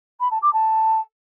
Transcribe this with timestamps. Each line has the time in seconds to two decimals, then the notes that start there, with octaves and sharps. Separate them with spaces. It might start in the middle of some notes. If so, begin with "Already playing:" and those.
0.20 B5
0.31 A5
0.42 D6
0.53 A5